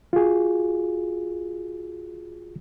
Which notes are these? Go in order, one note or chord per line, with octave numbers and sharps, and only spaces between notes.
F4 F#4 G#4